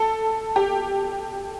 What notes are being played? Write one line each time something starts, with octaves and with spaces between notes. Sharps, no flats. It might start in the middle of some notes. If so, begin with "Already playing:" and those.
Already playing: A4
G4